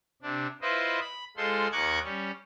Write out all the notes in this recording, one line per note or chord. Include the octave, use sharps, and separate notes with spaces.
C3 D4
E4 F4 B4 C5 D#5
B5
G#3 F4 A4 C5 C6
D#2 D#4 C#6 D6 F#6 G#6
G3 C#4